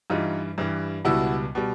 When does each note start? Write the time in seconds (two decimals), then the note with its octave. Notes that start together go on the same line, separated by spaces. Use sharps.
0.10 G2 E3 G3 D#4 F4
0.58 G2 E3 G3
1.05 C#2 B2 G3 E4 F#4
1.55 B2 G3